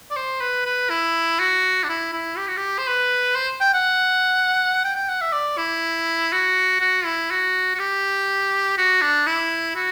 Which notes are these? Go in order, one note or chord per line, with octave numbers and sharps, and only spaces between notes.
D5
C5
B4
B4
E4
F#4
D4
E4
E4
G4
F#4
G4
C5
B4
C5
G5
F#5
G5
G5
F#5
E5
D5
E4
F#4
F#4
E4
F#4
F#4
G4
F#4
D4
E4
F#4